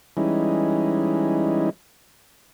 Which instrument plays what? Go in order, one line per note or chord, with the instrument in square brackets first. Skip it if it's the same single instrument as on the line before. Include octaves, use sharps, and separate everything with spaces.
[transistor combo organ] E3 G3 G#3 C#4 D#4 E4